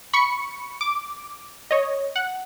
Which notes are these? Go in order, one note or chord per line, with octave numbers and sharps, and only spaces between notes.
B5 C#6 C#7
D6
C#5 D#5
F#5